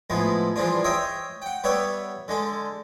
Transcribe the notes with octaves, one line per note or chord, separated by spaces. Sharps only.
A2 F3 G#3 B3 E4
E3 F3 G3 G#3 D4 F4
C5 C#5 D#5 E5 G5
F#5 G5
G3 B3 G4 C#5 E5 F#5
D3 G#3 A4